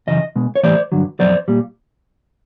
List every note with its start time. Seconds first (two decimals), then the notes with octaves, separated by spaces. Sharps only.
0.07 F#2 C#3 E3 D#5
0.36 B2 G#3
0.56 C#5
0.63 A2 E3 G3 C5 D5
0.92 G2 D3 F#3
1.20 F2 C#3 F#3 C5 D5
1.48 A#2 G3